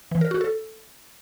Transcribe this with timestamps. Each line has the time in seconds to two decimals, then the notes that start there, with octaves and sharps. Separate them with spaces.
0.11 E3
0.21 A#4
0.31 F#4
0.41 A4